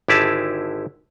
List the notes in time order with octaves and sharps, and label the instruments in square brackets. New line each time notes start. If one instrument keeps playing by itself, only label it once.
[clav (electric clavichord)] G#1 D3 E4 G4 G#4 A5